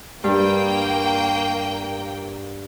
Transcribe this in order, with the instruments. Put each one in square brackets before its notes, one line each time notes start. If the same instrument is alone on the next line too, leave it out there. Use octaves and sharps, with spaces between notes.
[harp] G2 [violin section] A#3 G5